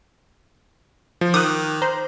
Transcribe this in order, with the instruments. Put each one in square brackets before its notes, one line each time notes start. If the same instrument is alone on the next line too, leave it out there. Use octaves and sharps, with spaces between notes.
[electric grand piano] F3
[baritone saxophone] D#3 [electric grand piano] D6 F#6 [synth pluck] D#6
[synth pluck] C5 [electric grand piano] A#5